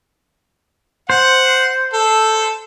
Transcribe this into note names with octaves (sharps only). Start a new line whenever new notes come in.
C5 F#5
A4